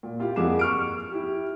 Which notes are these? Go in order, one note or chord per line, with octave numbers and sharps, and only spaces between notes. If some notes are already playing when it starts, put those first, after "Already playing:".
A#2
E4 F4 G4
F2 A#3 G#4 F#5 D6 E7
C#6 F6 D7
E4 G4